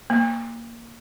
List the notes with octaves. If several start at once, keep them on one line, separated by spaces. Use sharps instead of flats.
A#3